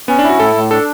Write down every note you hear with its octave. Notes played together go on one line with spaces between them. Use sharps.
B3 C#4
D4
E4
F#4
A2 A4
A2
D4 A4